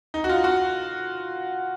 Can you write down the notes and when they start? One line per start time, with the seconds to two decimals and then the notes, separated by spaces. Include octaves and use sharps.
0.14 D#4
0.24 F#4
0.29 F4
0.44 F#4